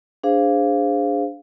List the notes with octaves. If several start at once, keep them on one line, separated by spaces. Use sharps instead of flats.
D4 G#4 C5 F5